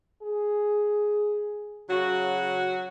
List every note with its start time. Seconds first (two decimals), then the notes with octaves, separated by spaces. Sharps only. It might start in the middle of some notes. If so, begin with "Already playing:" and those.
0.23 G#4
1.89 C#3 F#3 F#4